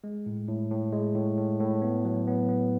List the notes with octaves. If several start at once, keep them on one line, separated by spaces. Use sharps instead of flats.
G#3
A2
A2
A2
G#3
A2
A2
A2
B3
F#3
B3
B3